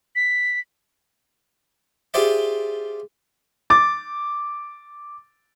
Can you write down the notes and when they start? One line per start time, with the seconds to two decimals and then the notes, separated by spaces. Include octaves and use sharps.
0.16 B6
2.14 F4 G4 G#4 C5 D5 E5
3.70 D6 A6